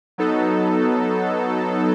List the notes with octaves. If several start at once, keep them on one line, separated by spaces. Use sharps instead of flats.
F#3 B3 D#4 A4